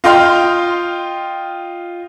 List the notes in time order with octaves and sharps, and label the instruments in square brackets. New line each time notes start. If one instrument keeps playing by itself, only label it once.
[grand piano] F4 D#5 G5 C6 F6